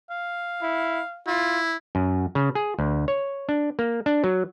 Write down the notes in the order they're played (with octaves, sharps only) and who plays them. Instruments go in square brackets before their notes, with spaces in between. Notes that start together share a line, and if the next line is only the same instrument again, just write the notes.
[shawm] F5
[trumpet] E4
[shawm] E4 [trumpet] F4
[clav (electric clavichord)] F#2
C#3
G#4
D2
C#5
D4
A#3
D4
F#3